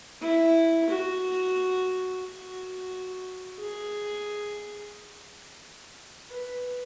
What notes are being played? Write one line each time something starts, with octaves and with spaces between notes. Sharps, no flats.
E4
F#4
F#4
G#4
B4